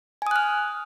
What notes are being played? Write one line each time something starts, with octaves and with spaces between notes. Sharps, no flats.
G#5 D#6 F6 F#6